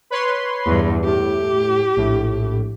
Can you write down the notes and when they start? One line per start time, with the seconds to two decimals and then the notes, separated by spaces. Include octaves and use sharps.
0.10 B4 C#5 C6
0.66 E2 G2
1.05 A2 G4
1.96 A#1 A2